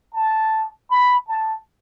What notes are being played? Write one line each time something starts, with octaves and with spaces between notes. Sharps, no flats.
A5
B5
A5